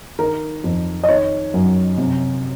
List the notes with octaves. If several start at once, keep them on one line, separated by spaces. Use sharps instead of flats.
D#3 A#4
F2
D#5
D#3 C#5
F#2
C3